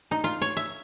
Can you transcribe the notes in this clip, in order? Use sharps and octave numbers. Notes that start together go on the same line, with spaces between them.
D#4
F4
C#5
E5